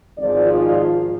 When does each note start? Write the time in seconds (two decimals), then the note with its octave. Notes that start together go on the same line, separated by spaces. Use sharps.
0.18 G#1 G#2 F3 D5
0.55 F4